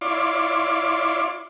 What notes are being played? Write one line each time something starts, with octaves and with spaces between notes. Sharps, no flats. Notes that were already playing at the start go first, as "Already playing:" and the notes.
E4 F4 C#5 D5 C6 D6